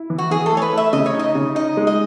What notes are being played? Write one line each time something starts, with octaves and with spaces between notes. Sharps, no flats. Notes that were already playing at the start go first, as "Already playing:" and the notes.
Already playing: E4
E3
F#4
E3 G#4
A4
A3 C#5
B4
A3 E5
C#3 D#5
C#5
D#4
D#5
C#3
D#4 D#5
G#3
D#5